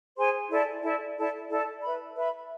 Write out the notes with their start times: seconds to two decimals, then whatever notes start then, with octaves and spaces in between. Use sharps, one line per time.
0.17 G#4 C5 G#5 C6
0.50 E4 A4 D5 A5
0.83 E4 A4 D5 A5
1.17 E4 A4 D5 A5
1.50 E4 A4 D5 A5
1.83 B4 E5 B5
2.16 B4 E5 B5